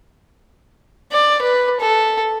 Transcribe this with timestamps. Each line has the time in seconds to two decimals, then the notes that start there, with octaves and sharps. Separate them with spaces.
1.12 D5
1.42 B4
1.80 A4